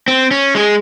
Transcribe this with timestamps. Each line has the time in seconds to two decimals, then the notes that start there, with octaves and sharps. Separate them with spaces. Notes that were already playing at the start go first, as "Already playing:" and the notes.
0.08 C4
0.31 C#4
0.55 G#3 G#4